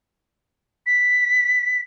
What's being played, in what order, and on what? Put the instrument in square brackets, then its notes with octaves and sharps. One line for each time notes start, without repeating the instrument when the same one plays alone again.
[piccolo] B6